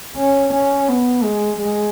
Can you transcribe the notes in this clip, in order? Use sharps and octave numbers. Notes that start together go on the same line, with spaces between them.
C#4
C#4
B3
G#3
G#3